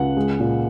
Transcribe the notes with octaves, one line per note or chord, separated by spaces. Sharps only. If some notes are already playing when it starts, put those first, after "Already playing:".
Already playing: C#2 F#5
G#3
A#2